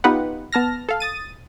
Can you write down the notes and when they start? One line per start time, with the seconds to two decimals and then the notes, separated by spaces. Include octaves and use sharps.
0.04 B3 D#4 F4 G4 B4 F#5
0.53 B3 A5 F6 A#6
0.89 A4 F5
1.00 D#6 A6 D#7